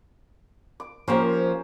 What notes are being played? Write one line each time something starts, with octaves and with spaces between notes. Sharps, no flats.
D6
F3 A#3 C#4 G4 A#4 C5